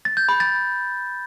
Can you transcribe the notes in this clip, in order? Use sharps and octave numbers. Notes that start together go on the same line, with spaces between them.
A6
G6
B5
A6